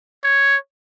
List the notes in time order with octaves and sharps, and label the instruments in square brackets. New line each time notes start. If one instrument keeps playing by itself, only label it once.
[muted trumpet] C#5